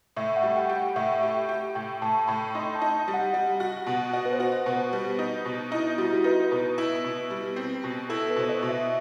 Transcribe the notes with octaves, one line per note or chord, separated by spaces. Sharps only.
A2 E5
F#5
G3
G5
G4
F#5
A2 E5
G4
G4
A2 G5
A2 A5
A2 B5
D#4 C6
A5
D#4
G3
F#5
G3 D#5
F#4
B2
F#4 D#5
B4
C5
F#4
C5
B2
B4
G3
D#4
B2
D#4 E4
G3 F#4
E4
F#4
D#4 B4
B2 B4
E4
B2
G3
C4
B2
E4 A4
B4
B2 C5
D#5
B2
E5